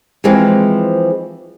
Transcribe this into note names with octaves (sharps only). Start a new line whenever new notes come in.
E3 F3 G#3 C4